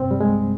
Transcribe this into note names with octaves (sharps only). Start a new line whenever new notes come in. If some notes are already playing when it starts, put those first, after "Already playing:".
Already playing: G2 C3 C4
G3
G#3
C2